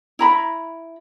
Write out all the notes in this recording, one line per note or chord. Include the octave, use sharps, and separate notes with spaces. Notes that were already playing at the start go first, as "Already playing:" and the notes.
E4 A#5 B5